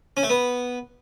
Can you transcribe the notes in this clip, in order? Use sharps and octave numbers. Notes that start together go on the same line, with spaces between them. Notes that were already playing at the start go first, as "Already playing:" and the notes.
C#4
A3
B3